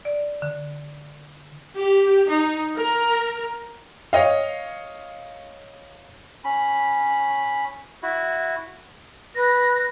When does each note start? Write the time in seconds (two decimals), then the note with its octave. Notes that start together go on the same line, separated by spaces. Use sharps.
0.05 D5
0.42 D3
1.76 G4
2.29 D#4
2.76 A#4
4.13 C#5 D#5 F5
6.44 C#4 B5
8.03 E4 F#4
9.35 B4 A#6